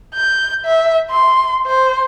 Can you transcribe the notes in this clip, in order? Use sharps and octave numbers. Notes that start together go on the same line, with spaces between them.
G6
E5
C6
C5